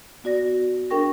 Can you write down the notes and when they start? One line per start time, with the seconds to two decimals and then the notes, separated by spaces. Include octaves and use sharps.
0.24 B3 F#4 D5 A#6
0.90 D4 G#4 A#4 G5 C#6 A#6